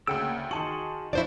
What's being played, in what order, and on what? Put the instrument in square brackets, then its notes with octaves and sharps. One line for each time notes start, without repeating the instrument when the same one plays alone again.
[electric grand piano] D2 G5 D7 [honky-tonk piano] C#3 [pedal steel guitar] A#3 F#5 E6
[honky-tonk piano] D#3 A5 F#7 [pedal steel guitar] F#4 G#4 C6 [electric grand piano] C#7
[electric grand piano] F3 D4 [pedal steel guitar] F#3 F#4 [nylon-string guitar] E4 C5 D5